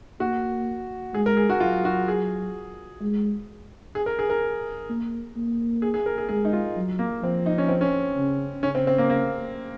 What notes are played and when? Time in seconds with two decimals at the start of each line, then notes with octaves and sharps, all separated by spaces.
0.20 A#3 F#4
1.14 G#3 G#4
1.26 A#4
1.37 G#4
1.50 F#4
1.60 F#3 F4
1.85 F#4
2.08 G#4
3.01 G#3
3.95 G#4
4.06 A#4
4.19 G#4
4.30 A#4
4.89 A#3
5.36 A#3
5.82 G#4
5.94 G#4
6.06 A#4
6.18 G#4
6.29 G#3 G#4
6.45 D#4
6.53 F4
6.76 F#3
6.99 A#3
7.22 F3 C4
7.46 D#4
7.58 C#4
7.68 C4
7.81 C#4
8.17 C#3
8.63 C#3 C#4
8.75 C4
8.87 C4
8.98 A#3
9.10 A#3